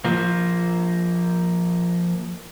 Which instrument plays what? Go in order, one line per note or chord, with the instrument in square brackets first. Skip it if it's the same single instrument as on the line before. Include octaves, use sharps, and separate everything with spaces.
[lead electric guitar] F3 A#3